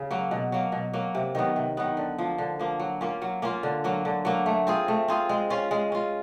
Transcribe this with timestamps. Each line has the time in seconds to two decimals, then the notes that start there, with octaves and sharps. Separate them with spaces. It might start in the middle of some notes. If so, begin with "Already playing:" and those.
Already playing: C#3
0.11 F#3 A#3
0.31 B2
0.52 F#3 A#3
0.72 B2
0.93 F#3 A#3
1.15 C3
1.35 D#3 F#3 B3
1.56 C3
1.77 D#3 F#3 B3
1.97 D3
2.18 F3 A#3
2.38 D3
2.60 F3 A#3
2.80 F#3
3.01 A#3 C#4 F4
3.22 F#3
3.42 A#3 C#4 F4
3.63 D3
3.84 F#3 A#3
4.05 D3
4.25 F#3 A#3
4.46 A3
4.67 C4 F4 G#4
4.88 A3
5.08 C4 F4 G#4
5.29 G#3
5.50 C#4 F4
5.71 G#3
5.92 C#4 F4